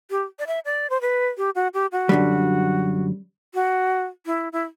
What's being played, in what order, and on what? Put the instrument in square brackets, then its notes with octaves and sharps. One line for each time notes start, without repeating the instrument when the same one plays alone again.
[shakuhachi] G4
D5
E5
D5
C5
B4
G4
F#4
G4
F#4
[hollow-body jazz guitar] F#2 D3 G3
[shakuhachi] F#4
E4
E4